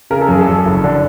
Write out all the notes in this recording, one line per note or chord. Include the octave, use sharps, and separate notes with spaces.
C#3 A#4
A4
F#2 G#4
A4
F#2
F#1
D3